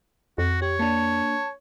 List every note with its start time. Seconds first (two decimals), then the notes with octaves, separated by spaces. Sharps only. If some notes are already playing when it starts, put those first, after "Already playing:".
0.38 F2 F#4
0.62 G4 C#5
0.79 A#3 D4 A5